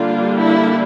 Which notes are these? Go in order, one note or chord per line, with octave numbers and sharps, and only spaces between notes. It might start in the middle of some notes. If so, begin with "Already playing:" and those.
Already playing: D3 G3 A#3 D4 F4
E4